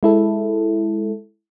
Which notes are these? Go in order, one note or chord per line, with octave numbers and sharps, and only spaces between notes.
G#3 E4 A4